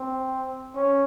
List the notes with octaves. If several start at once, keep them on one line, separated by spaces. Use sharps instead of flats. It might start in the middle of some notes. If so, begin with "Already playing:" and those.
Already playing: C4
C#4